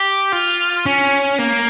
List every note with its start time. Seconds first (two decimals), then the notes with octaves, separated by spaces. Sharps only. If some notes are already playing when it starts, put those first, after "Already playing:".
Already playing: G4
0.33 F4
0.86 C#4
1.39 A#3